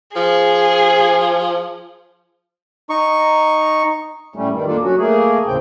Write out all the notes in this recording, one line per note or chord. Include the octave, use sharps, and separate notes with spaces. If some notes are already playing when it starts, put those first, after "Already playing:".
F3 G#4
D#4 C#6
A2 G3 A3 C#4
G2 D#3 G3
A#3 D4 F4 A4 D5
F#3 C#4 F#4
A3 A#3 G#4
D#2 A2 C#3 C4 G5